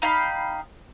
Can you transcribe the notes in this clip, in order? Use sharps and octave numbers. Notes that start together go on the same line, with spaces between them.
D#4 F5 G5 B5